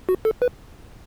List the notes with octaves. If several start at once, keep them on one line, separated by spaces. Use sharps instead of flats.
F#4
A4
B4